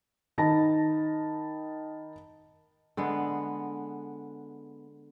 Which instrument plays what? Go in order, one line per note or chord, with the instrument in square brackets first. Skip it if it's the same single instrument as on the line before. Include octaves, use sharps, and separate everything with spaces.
[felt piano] D#3 D#4 A5 B5 A#6
[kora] D3 G#3 B3